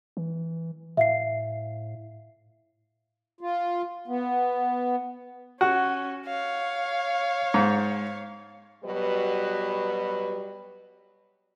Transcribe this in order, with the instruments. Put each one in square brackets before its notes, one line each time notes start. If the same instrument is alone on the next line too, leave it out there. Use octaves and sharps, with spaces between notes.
[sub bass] E3
[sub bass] A2 [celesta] E5 F5 C7
[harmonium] F4
B3
[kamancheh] C#4 [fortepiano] F#4
[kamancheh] C#5 F5
[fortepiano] G#2
[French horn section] B2 F#3 G3 B4